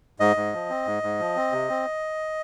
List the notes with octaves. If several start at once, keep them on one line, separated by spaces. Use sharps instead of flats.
G#2 D#5
G#2
F3
C4
G#2
G#2
F3
C4
C3
C4